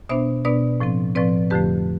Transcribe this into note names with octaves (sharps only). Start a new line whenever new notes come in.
B2 B3 D4 C5 E5
B2 B3 D4 B4 D5
A2 F3 C4
A2 F3 C4 B4 D5
F2 D3 F3 A3 G4 B4